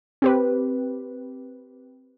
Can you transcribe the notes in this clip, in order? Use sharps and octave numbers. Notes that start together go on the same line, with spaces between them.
C4 G4 B4